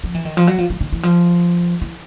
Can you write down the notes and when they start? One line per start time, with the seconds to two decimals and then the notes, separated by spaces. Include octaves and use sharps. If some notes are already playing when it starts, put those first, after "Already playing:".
0.04 F3
0.15 E3
0.25 D#3
0.37 F3
0.47 F#3
0.58 F3
0.70 F3
0.81 D#3
0.92 E3
1.03 F3
1.82 E3